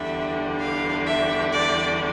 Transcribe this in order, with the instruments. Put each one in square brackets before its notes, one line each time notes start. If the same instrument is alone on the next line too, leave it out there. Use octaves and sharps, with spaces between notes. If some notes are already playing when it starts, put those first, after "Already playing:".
Already playing: [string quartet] E2 D3 G3 D4 [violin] E5
[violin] F5
E5
D5